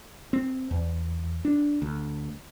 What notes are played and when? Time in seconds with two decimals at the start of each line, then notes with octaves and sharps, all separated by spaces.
0.33 C4
0.71 E2
1.45 D4
1.82 D2